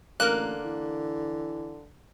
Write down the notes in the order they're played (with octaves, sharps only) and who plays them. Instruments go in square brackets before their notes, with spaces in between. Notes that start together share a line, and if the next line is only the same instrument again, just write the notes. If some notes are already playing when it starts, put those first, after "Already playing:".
[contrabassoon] A1 [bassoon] D3 [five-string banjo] A#3 [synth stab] A#4 F#6
[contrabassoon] E3